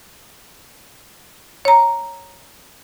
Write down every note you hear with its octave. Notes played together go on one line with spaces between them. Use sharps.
C#5 A#5